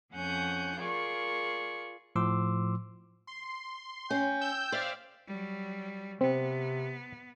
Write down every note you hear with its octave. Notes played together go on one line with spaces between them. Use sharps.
F2 C#4 F#5 G#5 G6
F4 G#4 A#4 D5 C#6
A2 F3 C6 D6 E6
C6
C#4 G5
E6 G6
C5 D5 E5 F5
F#3 G3
C3 B3 C4